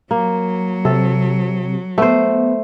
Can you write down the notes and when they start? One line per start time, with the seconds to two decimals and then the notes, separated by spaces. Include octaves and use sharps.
0.11 F#3 A#3
0.85 C3 A4
1.98 A3 B3 C5